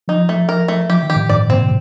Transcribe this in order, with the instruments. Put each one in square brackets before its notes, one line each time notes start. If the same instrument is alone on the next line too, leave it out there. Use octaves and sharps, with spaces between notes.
[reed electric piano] F3 [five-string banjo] D#4
[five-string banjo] A3
A#4
A3
[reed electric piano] F3 [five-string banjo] G4
[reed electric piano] D#3
[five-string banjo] G4
[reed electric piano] A2
[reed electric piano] G2 [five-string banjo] D5
[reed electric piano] G2
[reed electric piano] A#2 [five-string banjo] C4
[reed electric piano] C3